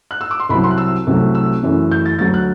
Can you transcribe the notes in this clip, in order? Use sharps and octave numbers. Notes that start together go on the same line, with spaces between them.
F#6
E6
D6
C6
C2 C3 F#3 B5
C6
F#6
E6
C2 C3 F#3 A3
E6
F#2 E3 A3
G6
A6
D2 D3 F#3 A6
F#6